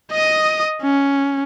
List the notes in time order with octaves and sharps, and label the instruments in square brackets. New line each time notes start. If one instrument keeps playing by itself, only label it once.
[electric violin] D#5 D#6
C#4